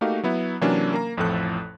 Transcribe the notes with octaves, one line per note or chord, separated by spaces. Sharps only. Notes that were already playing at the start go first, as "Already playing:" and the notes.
A3 A#3 D#4 F#4 G4 F5
F#3 B3 E4
C3 E3 F#3 A#3 C#4 D4
A#3 A#5
A1 F2 A2 F3 A4 F#6